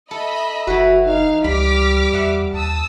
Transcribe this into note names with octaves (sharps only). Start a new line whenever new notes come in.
A4 D#5 E5 B5
F#1 E3 F#4 B4
D#4 F5
C#2 G3 B5 D6 F6 B6
E2 E5 F#5 B5
D#2 A5 D#6 E6